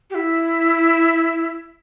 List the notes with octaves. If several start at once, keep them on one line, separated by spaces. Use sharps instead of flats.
G4
E4